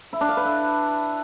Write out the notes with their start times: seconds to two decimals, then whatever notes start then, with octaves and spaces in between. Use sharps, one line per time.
0.13 E4
0.21 D4
0.29 F5
0.37 B4
0.45 E4